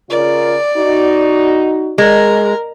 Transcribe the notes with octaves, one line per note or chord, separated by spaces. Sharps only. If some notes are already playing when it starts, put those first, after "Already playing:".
C#3 F4 A#4 D5
D#4 F#4
G#3 A#4